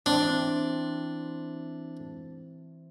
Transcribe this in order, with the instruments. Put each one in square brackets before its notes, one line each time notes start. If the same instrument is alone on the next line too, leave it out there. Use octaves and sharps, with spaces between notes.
[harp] E3 C4 E4 [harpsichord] D4